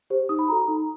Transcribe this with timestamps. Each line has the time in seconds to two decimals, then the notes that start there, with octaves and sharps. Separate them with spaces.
0.10 G4 C5
0.29 D#4 D#6
0.39 B5
0.49 F#4 A4 A#5
0.68 D#4